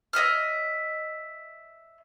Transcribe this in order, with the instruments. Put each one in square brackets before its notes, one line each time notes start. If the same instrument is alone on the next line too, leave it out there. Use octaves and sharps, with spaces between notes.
[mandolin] C#5 D#5 E5 F6